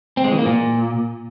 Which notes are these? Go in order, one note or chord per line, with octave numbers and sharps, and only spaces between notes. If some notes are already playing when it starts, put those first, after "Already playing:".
C4
G#3
E3
A#3
A#2